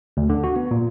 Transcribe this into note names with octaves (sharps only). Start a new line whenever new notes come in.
D2
D3
F#4
B3
A#2